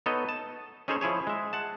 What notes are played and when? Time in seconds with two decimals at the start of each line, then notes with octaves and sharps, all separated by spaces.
0.06 B3 D#4 A4 C#5 D#5
0.29 A5
0.88 C#4 D#4 G#4 A4 C5 C#5
1.01 F3 E4 G#4 C#5
1.27 G#3 E5
1.53 F#5 A5